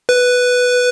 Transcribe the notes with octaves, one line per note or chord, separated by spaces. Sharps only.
B4